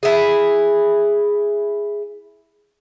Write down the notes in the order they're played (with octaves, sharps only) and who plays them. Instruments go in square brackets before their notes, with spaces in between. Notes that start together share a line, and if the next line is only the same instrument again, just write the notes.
[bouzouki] E4 G#4